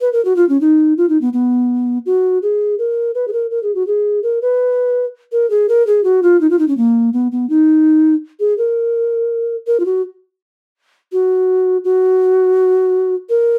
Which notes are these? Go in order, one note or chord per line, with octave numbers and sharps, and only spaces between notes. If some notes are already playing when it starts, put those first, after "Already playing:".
B4
A#4
F#4
F4
C#4
D#4
F4
D#4
B3
B3
F#4
G#4
A#4
B4
G#4
A#4
A#4
G#4
F#4
G#4
A#4
B4
A#4
G#4
A#4
G#4
F#4
F4
D#4
F4
D#4
C#4
A#3
B3
B3
D#4
G#4
A#4
A#4
F4
F#4
F#4
F#4
A#4